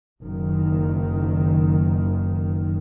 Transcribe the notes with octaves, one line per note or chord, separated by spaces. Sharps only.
F#1 D#3